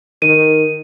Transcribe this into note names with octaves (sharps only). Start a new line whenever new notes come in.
D#3 D#7